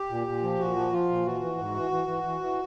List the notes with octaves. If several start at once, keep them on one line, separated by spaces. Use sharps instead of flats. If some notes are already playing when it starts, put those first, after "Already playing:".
Already playing: G4
A#2
A#2
F3
A#2 F#4
F3
F3 F4
A#2
E3 F#4
E3
G#2
E3
E3
E3
E3
E3